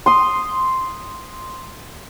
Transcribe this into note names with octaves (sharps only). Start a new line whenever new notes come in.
C6 D#6